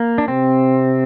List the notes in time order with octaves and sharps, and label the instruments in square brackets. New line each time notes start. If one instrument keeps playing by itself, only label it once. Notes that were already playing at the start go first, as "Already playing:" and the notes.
Already playing: [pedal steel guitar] A#3
D4
[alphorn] C3 [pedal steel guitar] C4